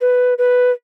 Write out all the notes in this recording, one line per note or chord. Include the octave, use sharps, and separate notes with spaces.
B4
B4